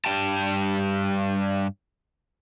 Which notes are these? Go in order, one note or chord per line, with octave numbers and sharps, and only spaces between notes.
G2 G3 G5 A5